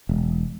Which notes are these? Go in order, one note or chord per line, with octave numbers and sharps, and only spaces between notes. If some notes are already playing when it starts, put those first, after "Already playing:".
E1